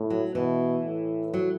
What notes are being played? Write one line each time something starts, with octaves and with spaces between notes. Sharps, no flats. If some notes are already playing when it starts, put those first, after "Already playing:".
Already playing: A2
F#3
B2 E3
A2
F#3